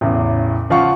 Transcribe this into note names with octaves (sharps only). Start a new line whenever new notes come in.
A1 E2 C#3
C#3 F3 F4 F5 F#5 C#6